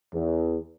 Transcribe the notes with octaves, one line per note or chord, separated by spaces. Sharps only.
E2